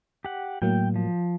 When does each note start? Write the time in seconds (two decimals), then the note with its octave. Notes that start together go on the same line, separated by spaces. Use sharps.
0.25 G4 F#5
0.62 A2 F#3 A#3 G5
0.96 F3